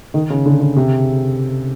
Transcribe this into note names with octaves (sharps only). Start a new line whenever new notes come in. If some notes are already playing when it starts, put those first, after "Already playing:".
D#3
C#3
D3
C#3
C3